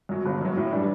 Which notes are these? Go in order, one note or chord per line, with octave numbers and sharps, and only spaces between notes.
F#2 F#3
G1
F#2 F#3
A2
E3 G3 D4